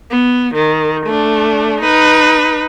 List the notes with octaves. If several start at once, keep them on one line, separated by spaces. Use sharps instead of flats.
B3
D#3
A3 D4
D#4 B4